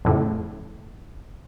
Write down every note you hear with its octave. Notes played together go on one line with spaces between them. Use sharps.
F2 A2 C#3